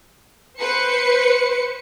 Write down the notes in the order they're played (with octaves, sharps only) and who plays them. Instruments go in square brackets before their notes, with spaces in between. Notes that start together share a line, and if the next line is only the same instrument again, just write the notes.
[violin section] B4 C5 C#7